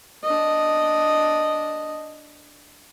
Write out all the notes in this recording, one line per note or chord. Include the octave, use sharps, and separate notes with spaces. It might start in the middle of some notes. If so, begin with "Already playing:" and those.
D4 D#5